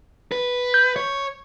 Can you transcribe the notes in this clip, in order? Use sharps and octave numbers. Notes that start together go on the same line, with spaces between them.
B4
G6
C#5